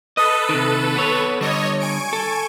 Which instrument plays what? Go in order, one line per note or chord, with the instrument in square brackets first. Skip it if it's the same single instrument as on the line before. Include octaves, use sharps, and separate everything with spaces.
[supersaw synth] A4 B4 [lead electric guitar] D#5
[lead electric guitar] C3 D#3
B3 C#5
[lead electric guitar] D3 G3 [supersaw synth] C#5 D#5 C#6
[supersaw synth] G#5 C#6 D7
[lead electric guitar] A4